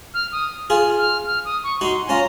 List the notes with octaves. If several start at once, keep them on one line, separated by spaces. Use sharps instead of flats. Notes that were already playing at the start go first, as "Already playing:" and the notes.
F6
D#6
F4 G#4 F6
F6
F6
D#6
C#6
D#4 F#4 C6
G#5
C#4 F4 A#5